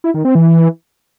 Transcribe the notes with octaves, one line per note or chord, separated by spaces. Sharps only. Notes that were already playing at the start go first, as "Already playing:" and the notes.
E4
D#3
C4
E3